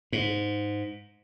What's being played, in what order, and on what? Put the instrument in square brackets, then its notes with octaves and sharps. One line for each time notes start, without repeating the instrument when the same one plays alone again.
[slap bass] G#2